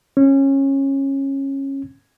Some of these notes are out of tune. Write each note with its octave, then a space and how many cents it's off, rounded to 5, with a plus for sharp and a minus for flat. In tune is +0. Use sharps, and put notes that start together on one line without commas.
C#4 -20